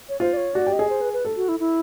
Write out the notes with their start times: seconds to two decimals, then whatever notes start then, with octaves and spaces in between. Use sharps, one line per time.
0.09 C#5
0.20 F4 C5
0.33 D5
0.37 C#5
0.54 F#4 D5
0.67 G4
0.73 D#5
0.79 G#4
0.90 C5
1.01 B4
1.13 B4
1.25 A4
1.36 F#4
1.49 E4
1.60 E4